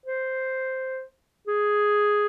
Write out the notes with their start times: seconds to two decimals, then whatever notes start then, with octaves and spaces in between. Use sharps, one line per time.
0.06 C5
1.47 G#4